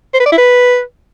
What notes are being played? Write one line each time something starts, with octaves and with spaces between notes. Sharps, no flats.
C5
B4
D5
E4
B4